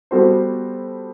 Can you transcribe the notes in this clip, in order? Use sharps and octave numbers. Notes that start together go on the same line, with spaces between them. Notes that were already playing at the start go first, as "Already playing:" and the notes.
G3 B3 F#4 A4 C5